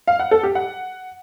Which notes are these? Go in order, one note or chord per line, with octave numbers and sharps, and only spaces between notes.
F5
F#5
A4
G4
F#5